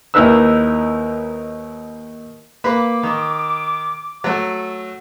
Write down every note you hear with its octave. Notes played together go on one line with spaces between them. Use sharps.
D#2 D#4 E4 A#4 B4 E6
A#3 B4 D6
D#3
F#3 A3 F#4